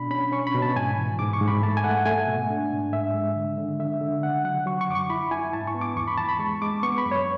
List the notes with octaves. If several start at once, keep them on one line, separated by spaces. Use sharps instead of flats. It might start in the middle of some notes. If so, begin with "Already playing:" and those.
Already playing: B2 D4 B5
C#4 B5
C#4 C#6
B5
B2
A5
G#2 G#5
E3
G#2 D6
C#6
G#2
B5
A3 A5
G#5
A3 F#5
A3 G#5
B2
D4
G#2
G#2 E5
G#3
D3
D3
D3 E5
D3
C#3 F#5
F#3 F#5
F#3 C#6
C#6
F#2 D6
C#6
E4 B5
E4 G#5
G#2 A5
C#6
B3
D6
E2 C#6
B5
E3 A5
B5
G#3 C#6
G#3 D6
B3 C#6
B5
F#2
C#5